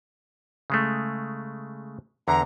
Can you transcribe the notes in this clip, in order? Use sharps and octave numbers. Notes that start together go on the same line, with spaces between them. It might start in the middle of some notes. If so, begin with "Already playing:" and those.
C#3 G#3 A3
E2 D3 A#5